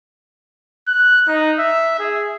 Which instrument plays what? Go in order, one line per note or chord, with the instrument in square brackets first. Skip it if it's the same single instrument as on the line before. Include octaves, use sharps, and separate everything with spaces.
[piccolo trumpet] F#6
D#4
E5
G#4